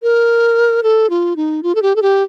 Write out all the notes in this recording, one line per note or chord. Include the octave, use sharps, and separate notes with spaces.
A#4
A4
F4
D#4
F4
A4
G4
A4
G4